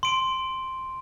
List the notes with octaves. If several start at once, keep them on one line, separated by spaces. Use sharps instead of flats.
C6 D7